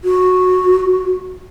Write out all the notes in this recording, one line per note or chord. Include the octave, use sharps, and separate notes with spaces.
F#4